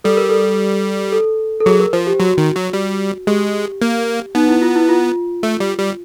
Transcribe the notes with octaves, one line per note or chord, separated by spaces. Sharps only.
G3 A4
A#4
A4
A4
A4
F#3 G#4
A#4
F3 C5
G4
F#3 F#4
D#3
F#3
G3
G#3 G4
A#3
B3 D#4
E4
F4
E4
F4
A3
G3
G3